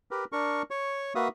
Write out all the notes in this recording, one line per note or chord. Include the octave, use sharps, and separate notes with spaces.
G4 A#4 B4
D4 A#4 C#6
C#5 C#6
A#3 F#4 B4 E5 F5 D#6